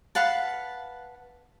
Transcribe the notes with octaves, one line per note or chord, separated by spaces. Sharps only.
B4 F5 F#5 A5